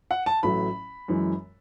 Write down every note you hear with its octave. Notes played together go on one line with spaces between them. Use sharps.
F#5
A5
A1 A2 F#3 B5
F#2 E3 G#3